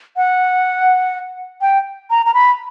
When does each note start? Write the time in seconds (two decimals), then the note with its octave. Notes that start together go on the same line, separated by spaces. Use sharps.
0.17 F#5
1.61 G5
2.10 A#5
2.26 A#5
2.34 B5